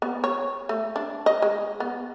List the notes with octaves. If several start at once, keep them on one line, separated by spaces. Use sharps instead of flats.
B3
C#5
A3
D4
D#5
G#3
B3